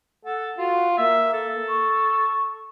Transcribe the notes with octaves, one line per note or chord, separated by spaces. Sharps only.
A4 F#5
F4 F#4
A#3 E5
A4
C#6